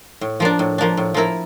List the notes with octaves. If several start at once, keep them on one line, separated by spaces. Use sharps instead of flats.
A2
F3 A#3 D4
A2
F3 A#3 D4
A2
F3 A#3 E4 A#4